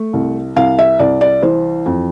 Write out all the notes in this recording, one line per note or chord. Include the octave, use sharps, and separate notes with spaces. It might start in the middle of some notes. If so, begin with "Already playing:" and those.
Already playing: A3
C2
C2 F5
E5
C2 D5
D5
E3 C5
F2